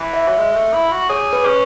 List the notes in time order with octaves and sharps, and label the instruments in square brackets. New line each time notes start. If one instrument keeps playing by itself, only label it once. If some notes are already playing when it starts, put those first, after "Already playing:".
Already playing: [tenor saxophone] E3
[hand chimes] E5
[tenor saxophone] F#3
G#3
G#3
A3
E4
F#4
[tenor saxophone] G#4 [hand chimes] C#5
[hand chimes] B4
[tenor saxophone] C#4